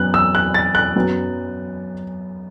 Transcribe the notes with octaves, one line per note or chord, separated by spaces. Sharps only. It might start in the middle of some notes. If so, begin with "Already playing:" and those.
Already playing: F#2 F#3 B3 F#6
E6
F#6
A6
F#6
F#2 F#3 B3